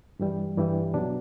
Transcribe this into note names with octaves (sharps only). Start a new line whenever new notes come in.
G2 E3 G3
G2 E3 G3
B2 F#3 D4